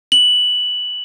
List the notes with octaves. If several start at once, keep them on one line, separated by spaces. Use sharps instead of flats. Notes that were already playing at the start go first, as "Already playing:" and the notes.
F#7